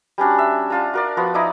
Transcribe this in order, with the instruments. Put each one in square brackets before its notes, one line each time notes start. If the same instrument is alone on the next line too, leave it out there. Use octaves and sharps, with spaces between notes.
[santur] G3 C#4 D4 F#4
E5
D4 F4 A#5
F#4 A#4 D5
F3 B3 F#4
D#4 E4 D5 D#5